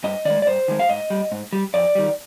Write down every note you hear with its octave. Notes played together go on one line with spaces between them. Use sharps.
G2 D#5
D#3 G#3 D5
D5
G2 C5
D#3 G#3
F5
G#2 D#5
G3
G#2
G3
F2 D5
D#3 G3